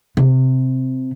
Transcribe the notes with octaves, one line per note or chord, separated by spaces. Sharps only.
C3